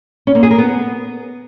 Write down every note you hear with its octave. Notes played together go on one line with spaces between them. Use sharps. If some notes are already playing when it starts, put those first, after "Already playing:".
C#4
A#3
G#4
A#4
B3